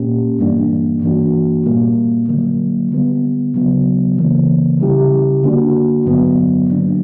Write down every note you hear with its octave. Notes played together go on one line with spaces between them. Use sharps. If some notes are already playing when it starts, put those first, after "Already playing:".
Already playing: A#2 A#3 C#4 G4
G2 E3 G3 A#3 D4
G2 E3 A#3 D4 F#4
A#2 G3 A#3
D3 F#3 A#3
D3 G3 B3
C#3 F#3 B3
C#3 E3 A#3
C#3 G3 C#4 E4 G4
D3 A#3 D4 F#4
G2 D3 F#3 B3
D3 F#3 A#3 D4